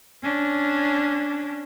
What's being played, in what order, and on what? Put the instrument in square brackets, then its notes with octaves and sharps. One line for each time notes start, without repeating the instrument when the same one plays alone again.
[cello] C#4 D4